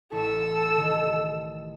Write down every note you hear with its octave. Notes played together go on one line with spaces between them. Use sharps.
A1 E4 A4 C#6 E6
D#3 G3